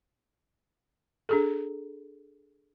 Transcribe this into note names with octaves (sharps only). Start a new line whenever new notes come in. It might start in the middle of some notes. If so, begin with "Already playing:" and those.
D4 G#4 A4